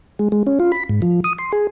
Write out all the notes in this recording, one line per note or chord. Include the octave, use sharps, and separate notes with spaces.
G#3
G#3
C#4
F4
B5
G#2
F3
D#6
C6
G#4